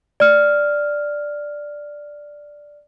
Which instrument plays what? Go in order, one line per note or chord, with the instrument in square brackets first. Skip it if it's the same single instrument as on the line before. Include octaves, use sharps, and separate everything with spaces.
[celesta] D5 F6